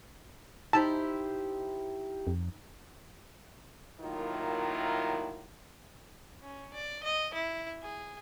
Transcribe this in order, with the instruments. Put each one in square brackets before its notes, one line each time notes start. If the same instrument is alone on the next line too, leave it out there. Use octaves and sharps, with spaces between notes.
[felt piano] D#4 [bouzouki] E4 G4 C5 [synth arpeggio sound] A5
[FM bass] F2
[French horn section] A2 D#3 F#3 A#3 E4 F4
[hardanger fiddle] C#4
D5
D#5
E4
G#4